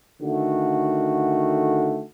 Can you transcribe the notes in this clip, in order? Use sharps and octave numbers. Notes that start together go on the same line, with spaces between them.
D3 D#3 A3 F#4